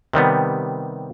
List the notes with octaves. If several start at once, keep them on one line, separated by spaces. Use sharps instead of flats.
C3 D#3 G3 B3